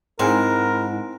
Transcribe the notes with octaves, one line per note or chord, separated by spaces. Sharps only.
G#2 C4 E4 A#4